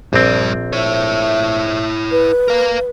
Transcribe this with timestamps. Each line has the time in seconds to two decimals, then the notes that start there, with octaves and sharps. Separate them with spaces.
0.13 A#1 G2 C4 D5
0.73 E4 C#5 E5
2.11 B4
2.48 A#4 F5